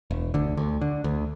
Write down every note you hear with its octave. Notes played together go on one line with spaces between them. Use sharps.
E1
D2 D3
D2
D3
D2